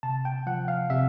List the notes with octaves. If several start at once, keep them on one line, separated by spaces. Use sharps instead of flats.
C3 A5
G5
F3 F#5
F5
C3 E5